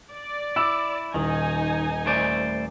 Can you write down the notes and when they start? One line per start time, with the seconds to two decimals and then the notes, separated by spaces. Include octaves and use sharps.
0.13 D5
0.56 E4 D6 E6
1.14 D#1 D#3 D#4 G#5
2.06 A3 C5 D5